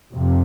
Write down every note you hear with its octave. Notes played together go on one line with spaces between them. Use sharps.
F2 C3